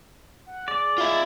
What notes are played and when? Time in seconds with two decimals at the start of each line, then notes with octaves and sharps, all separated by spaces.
0.46 F#5
0.68 G#4 D5
0.98 F4 E5